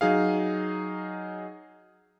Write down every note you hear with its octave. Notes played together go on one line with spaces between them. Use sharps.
F#3 D#4 G#4 F5